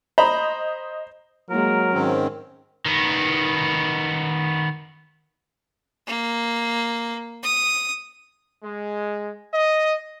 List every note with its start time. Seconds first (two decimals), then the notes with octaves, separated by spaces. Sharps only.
0.18 C5 D#5 A#5 B5
1.50 F#3 G#3 A#3 A#4
1.94 G#2 D#3 C4 C#4
2.86 D#3 B3
6.07 A#3
7.43 D#6
8.64 G#3
9.53 D#5